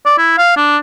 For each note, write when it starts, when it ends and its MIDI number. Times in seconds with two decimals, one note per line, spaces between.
0.06 0.17 74
0.18 0.37 64
0.38 0.52 77
0.57 0.78 62